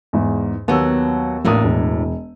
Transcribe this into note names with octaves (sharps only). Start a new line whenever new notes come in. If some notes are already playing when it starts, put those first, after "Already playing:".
E2 G#2
D#2 F#3 B3 E6
A1 E2 A2 A#3 D4 D#6
E1